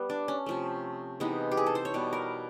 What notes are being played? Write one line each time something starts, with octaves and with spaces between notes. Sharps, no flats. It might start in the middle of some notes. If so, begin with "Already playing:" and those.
Already playing: G3 B3
D4
C#4
C3 F3 A3
C3 E3 G#3 B3 D#4
G4
G#4
A4
C5
C#5
B2 G3 B3
A#4